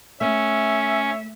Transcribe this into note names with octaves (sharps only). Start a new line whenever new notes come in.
A3 C#4 E5